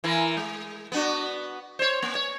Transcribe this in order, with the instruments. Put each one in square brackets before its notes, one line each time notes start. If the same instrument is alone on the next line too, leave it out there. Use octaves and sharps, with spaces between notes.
[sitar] E3 E4 A#4
G#3
B3 D4 F#4
C5 C#5
A#3
C#5